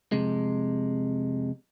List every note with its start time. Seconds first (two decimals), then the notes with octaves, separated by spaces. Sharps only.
0.12 F2 C3 G#3